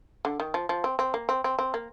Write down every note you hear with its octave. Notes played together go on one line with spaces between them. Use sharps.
D3
D#3
F3
F3
C4
C4
A#3
C4
C4
C4
A#3